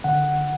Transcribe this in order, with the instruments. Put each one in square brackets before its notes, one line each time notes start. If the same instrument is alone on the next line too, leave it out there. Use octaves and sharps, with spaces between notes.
[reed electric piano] D3 F#5